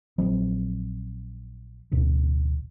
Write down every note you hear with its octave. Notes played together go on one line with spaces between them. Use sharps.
A#1 F3 F#3 C4
A1 D2 B2 D3